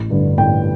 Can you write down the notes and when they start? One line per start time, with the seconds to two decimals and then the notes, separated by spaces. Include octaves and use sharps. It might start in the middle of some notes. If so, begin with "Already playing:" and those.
Already playing: A1
0.10 G2 D3
0.38 A1 G5